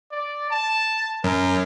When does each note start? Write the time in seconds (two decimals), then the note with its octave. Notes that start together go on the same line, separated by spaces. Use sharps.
0.12 D5
0.51 A5
1.24 F#2 A#4